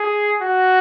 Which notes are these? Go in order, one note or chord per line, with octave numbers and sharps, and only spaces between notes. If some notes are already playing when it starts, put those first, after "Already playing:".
Already playing: G#4
F#4